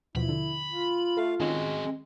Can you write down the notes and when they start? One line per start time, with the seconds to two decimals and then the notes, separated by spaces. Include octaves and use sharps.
0.16 D#2 B2 F3 E4 B5
0.29 D3
0.70 F4
1.17 A3 A4 F5
1.40 D#3 G#3 C4 C#4 F#4 G#4